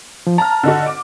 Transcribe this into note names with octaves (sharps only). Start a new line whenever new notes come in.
F3
A5 A#5 F6
D3 D#4 F#4
D6